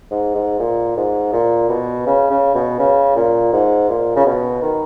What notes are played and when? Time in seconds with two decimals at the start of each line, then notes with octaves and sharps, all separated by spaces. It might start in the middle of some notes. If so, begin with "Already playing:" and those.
0.11 G#2
0.35 G#2
0.60 A#2
0.97 G#2
1.33 A#2
1.69 B2
2.06 C#3
2.30 C#3
2.55 B2
2.79 C#3
3.16 A#2
3.53 G#2
3.89 A#2
4.16 C#3
4.26 B2
4.62 D#3